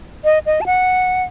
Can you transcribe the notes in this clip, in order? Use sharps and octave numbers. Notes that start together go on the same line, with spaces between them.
D#5
D#5
A5
F#5